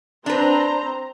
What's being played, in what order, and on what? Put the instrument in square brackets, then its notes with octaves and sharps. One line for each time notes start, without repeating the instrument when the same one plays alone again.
[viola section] C4 C5 A#5 [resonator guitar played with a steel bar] D4 B4